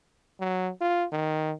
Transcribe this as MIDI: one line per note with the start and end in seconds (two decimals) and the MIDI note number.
0.40 0.70 54
0.81 1.05 65
1.12 1.53 51